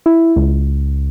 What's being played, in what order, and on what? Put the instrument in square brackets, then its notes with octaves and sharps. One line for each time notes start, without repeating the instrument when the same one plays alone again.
[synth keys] E4
C#2